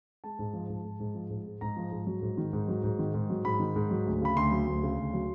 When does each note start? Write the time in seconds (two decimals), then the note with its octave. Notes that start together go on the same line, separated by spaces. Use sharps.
0.24 G#3 A5
0.39 G#2
0.53 F3
0.70 G#2
0.85 G#3
1.00 G#2
1.15 F3
1.30 G#2
1.46 G#3
1.61 G#2 A#5
1.76 F3
1.92 G#2
2.07 F#3
2.22 G#2
2.37 D#3
2.53 G#2
2.68 F#3
2.84 G#2
2.99 D#3
3.14 G#2
3.30 F#3
3.45 G#2 B5
3.60 D#3
3.76 G#2
3.91 F#3
4.06 D2
4.21 C#3 B5
4.36 D2 C6
4.51 F#3
4.67 D2
4.83 C#3
4.98 D2
5.13 F#3